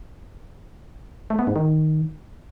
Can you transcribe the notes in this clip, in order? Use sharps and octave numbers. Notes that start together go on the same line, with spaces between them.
A3
B3
G#2
D#3